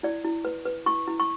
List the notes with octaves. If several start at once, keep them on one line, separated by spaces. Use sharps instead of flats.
E4 D5
E4
B4
B4
E4 C#6
E4
C#6